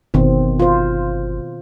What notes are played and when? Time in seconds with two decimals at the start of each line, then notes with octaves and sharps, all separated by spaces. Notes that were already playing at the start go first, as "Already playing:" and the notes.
0.14 G1 B2 D#3 C4
0.60 F4 C5